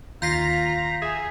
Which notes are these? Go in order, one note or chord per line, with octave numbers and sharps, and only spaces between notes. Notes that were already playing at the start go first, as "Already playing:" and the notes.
D#2 F4 A#5 G6 B6 C7
G#4 E5